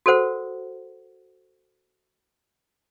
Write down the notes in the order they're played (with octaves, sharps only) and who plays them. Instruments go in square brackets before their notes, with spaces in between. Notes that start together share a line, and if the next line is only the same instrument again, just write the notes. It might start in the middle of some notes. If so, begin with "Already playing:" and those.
[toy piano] F#4 A4 A#4 C5 F#5